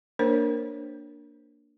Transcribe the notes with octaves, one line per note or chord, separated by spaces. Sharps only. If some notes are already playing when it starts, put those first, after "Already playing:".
A#3 D4 A#4 C5 C#5